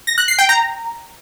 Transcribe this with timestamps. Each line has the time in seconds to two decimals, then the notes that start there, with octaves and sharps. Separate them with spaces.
0.07 A#6
0.18 F#6
0.28 C7
0.39 G5
0.49 A#5